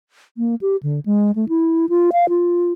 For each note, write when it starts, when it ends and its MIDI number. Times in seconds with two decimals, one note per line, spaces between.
0.38 0.55 58
0.61 0.76 67
0.83 1.00 50
1.06 1.31 56
1.36 1.48 57
1.49 1.86 64
1.89 2.10 65
2.12 2.29 77
2.29 2.72 65